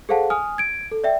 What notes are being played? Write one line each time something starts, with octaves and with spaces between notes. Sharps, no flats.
G#4 A4 C5 F5 F#5 A5
G#5 D#6 F6
G#6 D7
A4
D5 E5 G5